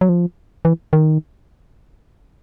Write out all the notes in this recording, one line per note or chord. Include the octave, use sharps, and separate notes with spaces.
F#3
F3
E3
D#3